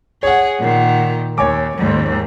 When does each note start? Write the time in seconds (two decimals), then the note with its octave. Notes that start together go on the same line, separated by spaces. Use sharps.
0.23 G#4 C#5 F#5
0.59 A#2 D#3
1.38 D#2 C#5 G#5 D6
1.77 D#2 G#2